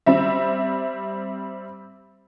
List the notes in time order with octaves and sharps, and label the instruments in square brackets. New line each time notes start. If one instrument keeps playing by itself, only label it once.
[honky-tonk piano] G3 C4 E5